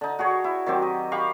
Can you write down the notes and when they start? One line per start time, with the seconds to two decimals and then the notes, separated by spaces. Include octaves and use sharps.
0.01 D3 D#4
0.19 F#4 G#4 C#5
0.44 E4
0.66 D#3 F#3 C4 G4
0.82 D#5
1.12 G4 F5 B5 C#6